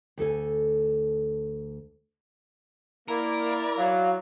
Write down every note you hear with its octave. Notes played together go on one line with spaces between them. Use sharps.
D2 A4 G#5
A#3 E4 A#4 D5
F#3 F5